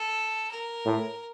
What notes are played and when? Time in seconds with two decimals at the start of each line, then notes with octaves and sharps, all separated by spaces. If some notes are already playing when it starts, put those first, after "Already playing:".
Already playing: A4
0.51 A#4
0.86 A2